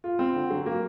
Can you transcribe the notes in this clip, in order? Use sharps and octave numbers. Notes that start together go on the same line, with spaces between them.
F4
C4
D3
F#3
A#3